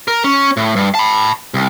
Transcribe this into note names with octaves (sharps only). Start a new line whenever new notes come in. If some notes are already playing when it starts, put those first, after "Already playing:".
A#4
C#4
A2
G2
A5 B5
C2